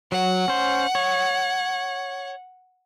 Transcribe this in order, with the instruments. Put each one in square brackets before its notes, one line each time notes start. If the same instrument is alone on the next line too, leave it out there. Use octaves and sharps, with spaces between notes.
[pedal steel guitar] F#3 [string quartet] F#5
[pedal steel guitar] C#4 C5
C#5